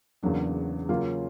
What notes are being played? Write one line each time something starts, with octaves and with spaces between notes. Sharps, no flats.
E2 C#3 F#3 A#3 D4
C#3 F#3 A#3 C#4 F4